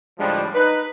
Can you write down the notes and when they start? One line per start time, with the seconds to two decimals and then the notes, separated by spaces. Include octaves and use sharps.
0.19 A2 D3 F3 G3 G#3 D4
0.54 D#4 B4